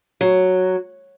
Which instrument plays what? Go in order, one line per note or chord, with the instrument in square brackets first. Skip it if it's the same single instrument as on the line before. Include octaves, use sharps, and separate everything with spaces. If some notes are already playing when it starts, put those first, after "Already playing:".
[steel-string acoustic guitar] F#3